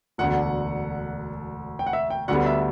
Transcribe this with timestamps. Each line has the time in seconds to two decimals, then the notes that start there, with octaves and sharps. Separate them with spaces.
0.18 E1 D2 D3 F#5
1.79 G5
1.86 F#5
1.93 E5
2.10 G5
2.28 D2 D3 G3 B3 F#5
2.46 E5